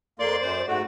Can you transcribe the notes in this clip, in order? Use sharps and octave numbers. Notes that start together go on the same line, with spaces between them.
F2 A#3 D5 C6
F#2 C5
G#2 A3 F#4